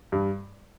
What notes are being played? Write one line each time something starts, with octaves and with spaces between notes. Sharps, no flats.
G2